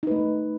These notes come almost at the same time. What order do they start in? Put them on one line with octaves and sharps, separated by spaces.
D#4 B4 A3